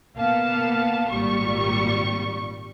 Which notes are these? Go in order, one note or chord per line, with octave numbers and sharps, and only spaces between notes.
A#3 B3 F5 A5
G#1 A#2 G3 C#6